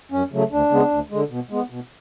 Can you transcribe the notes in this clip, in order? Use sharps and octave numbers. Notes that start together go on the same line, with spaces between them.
F#2 C#4
C#3 F#3 A3
D2 D4
C#3 G#3 B3
D2
D3 G#3
B2
G#3 B3
B2